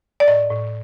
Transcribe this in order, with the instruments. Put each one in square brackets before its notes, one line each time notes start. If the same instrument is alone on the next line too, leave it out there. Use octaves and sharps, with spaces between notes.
[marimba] D5
A2 D#5
A2